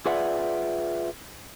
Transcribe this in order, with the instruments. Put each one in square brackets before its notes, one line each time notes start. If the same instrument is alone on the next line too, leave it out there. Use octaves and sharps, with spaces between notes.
[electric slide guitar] F4 G#4 B4 D5 E5 F#5